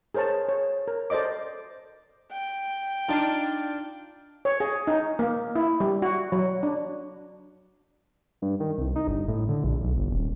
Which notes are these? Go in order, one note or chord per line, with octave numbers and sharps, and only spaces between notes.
G#4 A#4 C5 C#5 A5
C#5
A#4
A4 C5 D5 D#5 D6
G5
D4 D#4 F4 A5
C#5
G#4
D#4
A#3
E4
G3
F#4
F#3
D4
G2
D#3
C2
D#4
G1
A2
D3
A#1
B1
G1
D#1